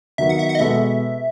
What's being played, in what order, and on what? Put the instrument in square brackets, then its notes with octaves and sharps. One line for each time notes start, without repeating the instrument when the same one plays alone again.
[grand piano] D#3 F#3 B3 [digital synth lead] E5
[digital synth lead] F#5
E5
F#5
D#5
[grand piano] B2 G#3 B3 F#4 A4 [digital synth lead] E5